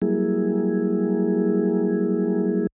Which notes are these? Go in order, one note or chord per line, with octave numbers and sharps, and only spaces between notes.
F#3 G3 A#3 E4 G#4